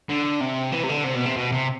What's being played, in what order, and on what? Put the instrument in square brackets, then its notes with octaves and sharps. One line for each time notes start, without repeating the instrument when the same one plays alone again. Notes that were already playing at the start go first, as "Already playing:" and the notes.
[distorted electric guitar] D3
C3
E3
C3
D3
C3
B2
C3
B2
C3